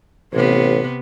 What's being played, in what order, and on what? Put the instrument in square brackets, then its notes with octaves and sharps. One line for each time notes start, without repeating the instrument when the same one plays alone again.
[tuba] A1 [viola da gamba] C3 B3